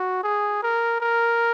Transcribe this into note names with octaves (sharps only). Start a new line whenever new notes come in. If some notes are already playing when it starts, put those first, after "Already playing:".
Already playing: F#4
G#4
A#4
A#4